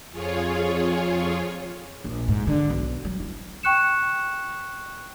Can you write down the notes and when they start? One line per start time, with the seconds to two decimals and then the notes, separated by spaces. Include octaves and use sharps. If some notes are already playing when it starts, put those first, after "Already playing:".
0.12 F2 F4 G#4 C#5
2.04 A#1
2.28 G#2
2.47 D3
2.70 B1
3.05 F#3
3.20 E4
3.63 G5 C#6 F#6 C#7 E7